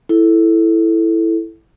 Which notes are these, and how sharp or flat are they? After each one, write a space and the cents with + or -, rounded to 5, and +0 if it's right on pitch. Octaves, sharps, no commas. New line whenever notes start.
E4 +0 A4 +0